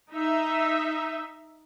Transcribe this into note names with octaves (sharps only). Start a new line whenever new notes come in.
D#4 E5